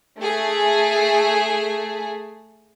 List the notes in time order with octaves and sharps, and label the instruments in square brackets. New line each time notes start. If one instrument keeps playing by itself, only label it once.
[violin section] A3 G#4